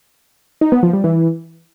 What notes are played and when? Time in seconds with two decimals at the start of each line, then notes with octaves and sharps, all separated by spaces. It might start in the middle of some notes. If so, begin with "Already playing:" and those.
0.61 D#4
0.72 B3
0.83 F3
0.93 G3
1.04 E3